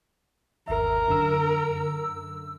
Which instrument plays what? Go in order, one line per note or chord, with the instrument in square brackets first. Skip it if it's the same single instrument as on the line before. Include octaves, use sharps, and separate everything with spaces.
[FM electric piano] G1 D#2 E5 [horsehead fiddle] A#4
[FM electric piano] F#2 D3 E6